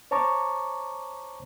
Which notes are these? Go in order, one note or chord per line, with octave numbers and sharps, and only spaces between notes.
C5 C#5 A5 A#5 C#6 D6